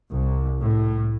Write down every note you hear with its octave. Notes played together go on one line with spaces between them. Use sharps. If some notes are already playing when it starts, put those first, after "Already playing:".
C2
A2